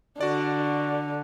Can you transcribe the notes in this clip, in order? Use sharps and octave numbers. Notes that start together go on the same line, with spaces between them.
D3 F#4 D5